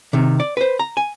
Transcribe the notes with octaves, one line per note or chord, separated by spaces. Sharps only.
C3 D#3
D5
B4 C5
A#5
G#5